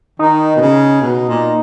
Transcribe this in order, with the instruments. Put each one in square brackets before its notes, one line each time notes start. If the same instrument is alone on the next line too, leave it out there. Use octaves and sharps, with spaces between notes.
[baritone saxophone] D#3 [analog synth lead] D#4
[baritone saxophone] B2
C#3
B2
A#2